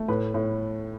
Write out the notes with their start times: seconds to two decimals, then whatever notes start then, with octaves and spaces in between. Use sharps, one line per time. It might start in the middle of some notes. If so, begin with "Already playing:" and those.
Already playing: A3
0.08 A2 B4
0.34 A2